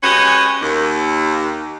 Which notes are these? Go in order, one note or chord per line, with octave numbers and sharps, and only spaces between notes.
G#3 C#4 F#4 G4 B4 D#5
D#2